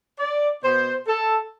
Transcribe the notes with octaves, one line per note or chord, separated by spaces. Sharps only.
D5
B2 B3 C5
A4